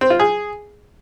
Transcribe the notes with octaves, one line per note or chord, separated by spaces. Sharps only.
C4
F4
G#4